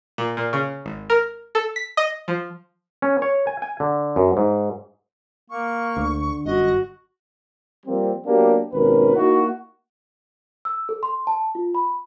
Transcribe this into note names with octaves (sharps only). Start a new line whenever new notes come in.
A#2
A#2
C#3
G#1
A#4
A4
B6
D#5
F3
C#4
C#5
G#5
G#5
D3
F#2
G#2
A#3 C#6
D2 D3
G1 F#2 F#4 D#5
F3 G3 A#3 C4
F#3 A#3 B3 D4 G4
G#1 D#2 B2 C#4 A#4 B4
A#3 D#4 E4 F#4
E6
A4
C6
A5
F4
B5